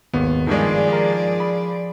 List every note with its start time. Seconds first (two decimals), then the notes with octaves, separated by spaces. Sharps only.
0.13 G#1 D#2 B3
0.47 G2 D#3 F3 G#3 G#4 D5
0.93 A#4
1.40 B5